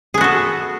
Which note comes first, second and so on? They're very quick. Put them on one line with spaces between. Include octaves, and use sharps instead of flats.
G#4 B3 F#4 A4